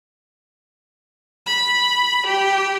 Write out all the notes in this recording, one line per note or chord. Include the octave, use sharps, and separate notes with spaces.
B5
G4